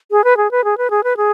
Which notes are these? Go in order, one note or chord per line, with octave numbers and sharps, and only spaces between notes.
G#4
B4
G#4
B4
G#4
B4
G#4
B4
G#4